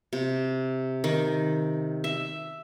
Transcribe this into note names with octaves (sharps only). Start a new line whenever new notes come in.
C3
D#3
E5